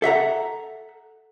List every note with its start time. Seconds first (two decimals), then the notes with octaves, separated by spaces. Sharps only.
0.02 A4 E5 F#5 A#5